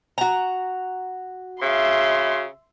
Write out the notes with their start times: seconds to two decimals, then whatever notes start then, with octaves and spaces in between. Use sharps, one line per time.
0.18 F#4 A#5
1.62 C#3 E5 C6